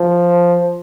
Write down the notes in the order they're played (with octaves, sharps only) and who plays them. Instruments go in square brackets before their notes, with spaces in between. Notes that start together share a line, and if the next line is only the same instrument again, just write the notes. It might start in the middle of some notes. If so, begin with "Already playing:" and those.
Already playing: [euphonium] F3